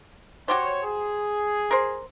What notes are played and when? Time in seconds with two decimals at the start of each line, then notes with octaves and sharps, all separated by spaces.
0.48 F#4 G4 C5 C#5
0.82 G#4
1.71 A#4 C5